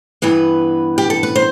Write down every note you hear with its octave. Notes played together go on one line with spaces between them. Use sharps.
G2 E3 B3 B4
G4
A4
B4
C5